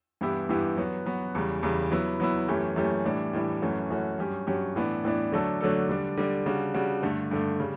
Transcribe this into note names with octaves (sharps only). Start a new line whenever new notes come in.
G2 E3 B3 E4 G4
G2 E3 B3 E4 G4
F#3 B3 F#4
F#3 B3 F#4
E2 C#3 G3
E2 C#3 G3
F#3 B3 E4
F#3 B3 E4
F#2 E3 A3 C#4 G4
F#2 E3 A3 C#4 G4
A2 E3 G3 D4
A2 E3 G3 D4
F#2 E3 A3 C#4 F#4
F#2 E3 A3 C#4 F#4
G2 F#3 C#4 G4
G2 F#3 C#4 G4
A2 E3 B3 D4
A2 E3 B3 D4
D3 F#3 A3 D4 A4
D3 F#3 A3 D4 A4
D3 G3 D4
D3 G3 D4
C#3 G3 D4 F#4
C#3 G3 D4 F#4
G2 D3 A3
G2 D3 A3
C#3 G3